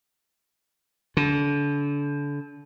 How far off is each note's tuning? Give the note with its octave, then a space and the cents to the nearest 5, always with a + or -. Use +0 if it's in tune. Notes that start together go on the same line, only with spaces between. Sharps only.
D3 -30